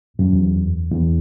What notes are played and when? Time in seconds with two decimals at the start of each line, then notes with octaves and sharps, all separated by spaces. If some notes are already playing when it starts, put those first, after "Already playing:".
0.19 F#2
0.33 E2
0.91 E2